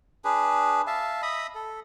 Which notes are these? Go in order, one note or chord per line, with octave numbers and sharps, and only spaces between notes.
D4 G#4 B4
E5 F5 A5
D#5 E5 B5 D#6
A4